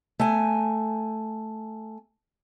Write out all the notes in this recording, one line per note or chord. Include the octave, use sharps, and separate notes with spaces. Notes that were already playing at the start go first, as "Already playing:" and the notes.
A3 G#5